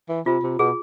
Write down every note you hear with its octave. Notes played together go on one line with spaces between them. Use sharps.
E3
C3 F4
C3
B2 G#4